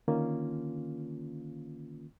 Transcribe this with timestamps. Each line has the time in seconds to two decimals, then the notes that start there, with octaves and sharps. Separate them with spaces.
0.08 D3 D#3 A#3 C#4 F4